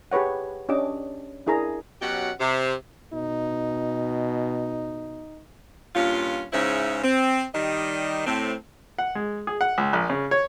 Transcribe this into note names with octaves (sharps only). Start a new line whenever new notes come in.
G4 G#4 B4 C#5 F#5
C#4 D4 G4 D#5 D6
D4 E4 G#4 A#4 A#5
B2 F#3 C#4 G4 F#5
C3
B2 D#4
G2 A#2 C#4 F4
G#2 C#3 C#4 E4 C5 E5
C4
D#3 G3 D#5
A2 C4
F#5
G#3
G#4
F#5
C#2
A#1
C#3
C#5